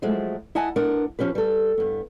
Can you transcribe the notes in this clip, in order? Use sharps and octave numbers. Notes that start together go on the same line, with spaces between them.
F3 F#3 G#3 A3
E4 D#5 F#5 G#5 A5
B3 D4 A#4 F#5
F3 C#4 G4 B4
G3 A4
G2 B3